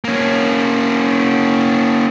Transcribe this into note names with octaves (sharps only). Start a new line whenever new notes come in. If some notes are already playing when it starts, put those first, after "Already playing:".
A#3 C#4